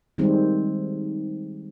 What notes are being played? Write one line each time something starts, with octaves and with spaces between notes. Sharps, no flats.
D#3 G3 G#3 C4